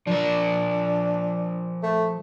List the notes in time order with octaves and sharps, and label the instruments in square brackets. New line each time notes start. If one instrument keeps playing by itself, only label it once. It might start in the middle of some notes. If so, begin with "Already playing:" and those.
[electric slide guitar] F3 A#4 [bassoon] D4
[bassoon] A3